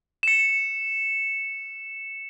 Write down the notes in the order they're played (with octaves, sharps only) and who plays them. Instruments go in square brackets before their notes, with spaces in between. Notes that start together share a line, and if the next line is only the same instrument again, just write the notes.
[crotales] C#7 E7